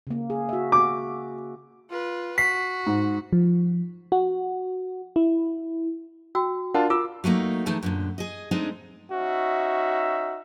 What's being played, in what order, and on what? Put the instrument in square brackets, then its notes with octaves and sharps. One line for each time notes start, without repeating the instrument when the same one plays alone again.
[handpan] C#3 A#3
G#4
F#4 E5
[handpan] F#4 [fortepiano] D6
[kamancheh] F4 B4
[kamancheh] F#4 [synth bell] B6 [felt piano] C7
[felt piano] G#2
[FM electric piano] F3
F#4
E4
[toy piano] F#4 G5 E6
[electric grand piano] D4 F4 A5 [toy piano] A#4 F#5
[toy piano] F4 [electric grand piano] D6 E6
[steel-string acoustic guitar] F#3 A3 A#3 D#4
E3 A3 D#4 G#4 A5
F#2 A#2 D3
G#4 D#5
G#3 A3 C4 D4 D#4 G#4
[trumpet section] C#4 D#4 E5 [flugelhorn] F#4